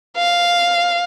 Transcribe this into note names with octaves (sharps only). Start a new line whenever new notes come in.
F5